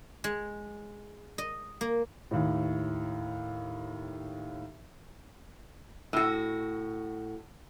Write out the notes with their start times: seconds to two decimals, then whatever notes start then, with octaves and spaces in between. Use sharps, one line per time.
0.24 G#3
1.38 D#5
1.81 A#3
2.31 D#2 A2
6.13 A2 F#4